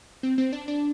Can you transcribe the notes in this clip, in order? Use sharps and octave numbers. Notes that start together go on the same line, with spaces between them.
C4
C4
D4
D4